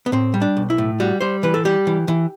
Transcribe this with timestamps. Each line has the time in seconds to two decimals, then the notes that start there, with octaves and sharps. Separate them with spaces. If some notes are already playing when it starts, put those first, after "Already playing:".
0.06 B3
0.12 A2 C4
0.34 G3
0.42 D4
0.57 B1
0.70 E4
0.78 A2
1.00 G3 F#4
1.21 G3 C5
1.43 E3 B4
1.54 A4
1.65 G3 G4
1.87 E3
2.08 E3